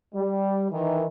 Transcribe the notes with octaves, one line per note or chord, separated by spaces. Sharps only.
G3
D#3 E3